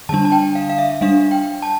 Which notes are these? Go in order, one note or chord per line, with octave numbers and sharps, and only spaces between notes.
D3 G3 D4 A5
A5
G5
F5
F5
E5
G3 D4 F5
G5
A5